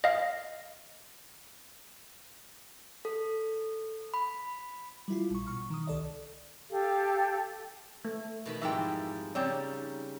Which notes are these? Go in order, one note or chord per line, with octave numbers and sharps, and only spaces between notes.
D#5 F5
A4
B5
G3 E4 F4
A#1 C#6
B2 C#6 F6
D#3 D#6
C2 A4 D5 D#5
G4 A4 F5
A3
B2 D#3 B5
F2 G#2 E3 G3 E5 G5
C#3 G3 C4 D#4 C#5 D5 G5